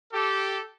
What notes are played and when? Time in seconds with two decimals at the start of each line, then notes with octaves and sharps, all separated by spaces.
0.13 G4 A4